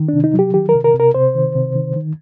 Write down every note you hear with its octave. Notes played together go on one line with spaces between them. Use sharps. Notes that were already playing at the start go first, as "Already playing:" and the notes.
Already playing: D#3
C3 D4
D#4
F#3
G4
D#3 G4
A#4
C3
A#4
C3
A#4
C3 C5
D#3
C3
D#3
D#3